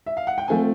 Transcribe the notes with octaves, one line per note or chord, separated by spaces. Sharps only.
E5
F5
F#5
G5
F3 A3 C4 G#5